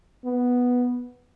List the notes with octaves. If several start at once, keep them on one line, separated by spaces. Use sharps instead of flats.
B3